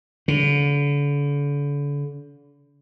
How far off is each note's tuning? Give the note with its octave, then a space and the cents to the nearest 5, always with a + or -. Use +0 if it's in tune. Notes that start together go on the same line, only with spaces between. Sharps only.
D3 -40